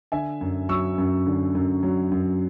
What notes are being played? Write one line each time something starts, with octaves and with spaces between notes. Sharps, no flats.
D3 E5 G#5
F#2
F#3 C#6 E6
F#2
D3
F#2
F#3
F#2